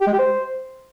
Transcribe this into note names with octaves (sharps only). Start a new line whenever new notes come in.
G4
G#3
G4
C5